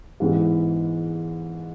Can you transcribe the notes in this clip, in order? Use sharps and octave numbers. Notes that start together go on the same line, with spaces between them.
G#2 E3 G#3 B3